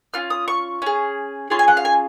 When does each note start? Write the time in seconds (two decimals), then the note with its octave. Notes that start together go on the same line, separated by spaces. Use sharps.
0.14 C#4 F4 F6
0.30 D#6
0.48 C#6
0.82 C#4 G#4
1.50 C#4 F4 G#4 C6
1.59 G#5
1.68 F#5
1.77 F5
1.85 G#5